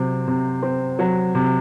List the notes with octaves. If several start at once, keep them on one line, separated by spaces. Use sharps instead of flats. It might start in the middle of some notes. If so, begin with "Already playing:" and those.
Already playing: C3 F#3 C4
C3
C4
F#3
C3